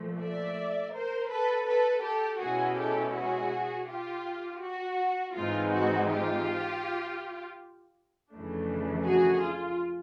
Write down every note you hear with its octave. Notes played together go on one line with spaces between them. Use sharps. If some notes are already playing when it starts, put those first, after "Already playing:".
Already playing: A#2 F3 A3
D5 E5
A#4 C5
A4 B4
A4 B4
G4 A4
B2 G#3 C#4 E4 F#4 G#4
G4 A4
F#4 G#4
F4 G4
F#4
G#2 E3 G#3 C4 D#4 F4
F#4
F4 G4
F2 C#3 E3 A3 D4
F#4 G#4
F4